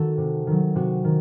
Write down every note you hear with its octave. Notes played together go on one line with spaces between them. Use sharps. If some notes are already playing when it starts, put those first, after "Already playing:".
Already playing: D#3 F#4 A4
C3
D#3 F#3
C3 F#4
D#3